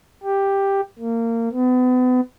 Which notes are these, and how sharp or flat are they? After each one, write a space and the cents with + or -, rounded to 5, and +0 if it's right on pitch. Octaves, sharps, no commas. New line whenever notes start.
G4 +5
A#3 -25
B3 +35